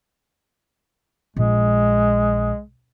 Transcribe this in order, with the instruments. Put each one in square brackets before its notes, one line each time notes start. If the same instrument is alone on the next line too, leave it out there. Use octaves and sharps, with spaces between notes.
[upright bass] A#1 [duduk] G#3